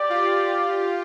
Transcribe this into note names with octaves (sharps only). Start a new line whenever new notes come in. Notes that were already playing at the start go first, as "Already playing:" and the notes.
Already playing: G4 D5
F4